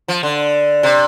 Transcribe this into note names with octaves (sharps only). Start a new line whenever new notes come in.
F3
D3
C3